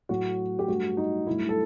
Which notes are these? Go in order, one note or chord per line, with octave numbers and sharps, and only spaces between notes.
A2 F#3 A3 F#4
G4
G2 F#3 A3 F#4
D#4
G2 F#3 A3 E4
A4